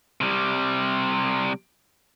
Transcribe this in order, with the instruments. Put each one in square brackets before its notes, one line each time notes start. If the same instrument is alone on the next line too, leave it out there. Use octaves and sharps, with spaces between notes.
[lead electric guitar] C3 G3